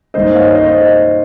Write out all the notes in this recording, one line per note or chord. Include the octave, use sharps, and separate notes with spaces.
G2 D#3 A#3 C5 D#5
C#5 F5
C5 D#5